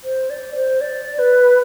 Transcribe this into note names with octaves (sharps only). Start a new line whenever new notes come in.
C5
D5
C5
D5
B4